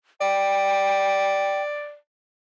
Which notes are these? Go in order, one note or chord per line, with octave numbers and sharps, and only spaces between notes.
D5 G5